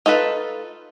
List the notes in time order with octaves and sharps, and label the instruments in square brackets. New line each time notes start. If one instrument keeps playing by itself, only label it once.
[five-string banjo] D#4 F4 A4 B4